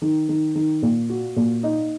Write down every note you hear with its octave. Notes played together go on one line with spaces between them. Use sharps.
D#3
D#3
D#3
A#2
F#4
A#2
D#4